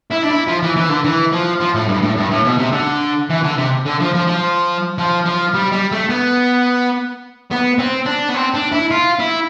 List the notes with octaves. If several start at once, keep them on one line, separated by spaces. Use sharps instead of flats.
E4
D4
E4
F3
E3
E3
D3
E3
F3
F3
A2
G2
A2
G2
A2
B2
C3
D3
E3
D3
C3
D3
F3
F3
F3
F3
F3
G3
G3
A3
B3
B3
C4
D4
B3
C4
D4
E4
F4
E4